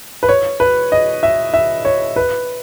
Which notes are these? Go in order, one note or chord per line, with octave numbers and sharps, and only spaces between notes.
B4
C#5
B4
D#5
E5
E5
C#5
B4